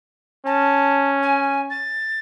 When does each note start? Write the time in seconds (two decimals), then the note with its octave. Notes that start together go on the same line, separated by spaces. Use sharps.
0.46 C#4 A5
1.22 G#5
1.70 A6